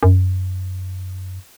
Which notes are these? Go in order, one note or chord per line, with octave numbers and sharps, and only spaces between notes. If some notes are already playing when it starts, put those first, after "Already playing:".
F#2